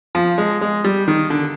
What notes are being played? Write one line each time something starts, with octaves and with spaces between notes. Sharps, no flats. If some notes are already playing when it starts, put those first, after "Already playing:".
F3
G#3
G#3
G3
D#3
D3